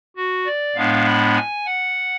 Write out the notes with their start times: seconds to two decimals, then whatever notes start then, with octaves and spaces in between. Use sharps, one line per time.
0.16 F#4
0.46 D5
0.76 A2 G#3 B3 D4 F5
1.06 B5
1.36 G#5
1.66 F#5